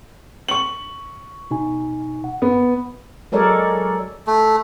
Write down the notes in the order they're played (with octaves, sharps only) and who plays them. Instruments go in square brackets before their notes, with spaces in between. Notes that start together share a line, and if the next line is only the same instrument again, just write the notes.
[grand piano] C#6 F#7
[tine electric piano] B2 D#4 G#5
F#5
[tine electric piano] G2 [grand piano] B3
[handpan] F#3 G#3 A4 A#4 C#5 D5
[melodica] A3